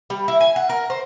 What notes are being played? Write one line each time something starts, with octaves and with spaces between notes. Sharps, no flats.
G3
E4
G#5
F#5
A#4
C5